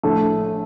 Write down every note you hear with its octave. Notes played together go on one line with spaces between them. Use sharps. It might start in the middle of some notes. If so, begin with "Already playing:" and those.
A#1 A2 A3